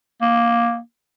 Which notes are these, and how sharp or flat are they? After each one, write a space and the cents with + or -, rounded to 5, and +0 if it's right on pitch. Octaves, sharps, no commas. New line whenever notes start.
A#3 +10